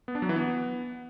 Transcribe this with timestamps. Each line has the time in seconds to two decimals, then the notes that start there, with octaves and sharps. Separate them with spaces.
0.08 B3
0.15 D4
0.22 F#3
0.29 E3
0.36 B3